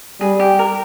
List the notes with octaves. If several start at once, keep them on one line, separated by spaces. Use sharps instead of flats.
G3 G#4
G4
A#4